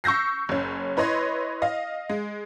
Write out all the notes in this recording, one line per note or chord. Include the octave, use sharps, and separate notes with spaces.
C#6 E6 G6 A#6 C7
F#1 C#4
E4 B4 C#5 D#5 C6
D#5 F5
G#3